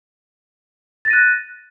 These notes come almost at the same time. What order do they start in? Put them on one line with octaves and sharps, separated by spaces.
A6 A#6 D#7 F#6